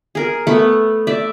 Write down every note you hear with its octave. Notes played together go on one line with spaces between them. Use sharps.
G#4 A#4
A3 B3 B5 C#6
D5 E5